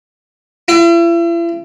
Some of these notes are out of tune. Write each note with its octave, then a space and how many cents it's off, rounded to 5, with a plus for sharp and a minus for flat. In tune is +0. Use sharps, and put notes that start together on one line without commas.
E4 +40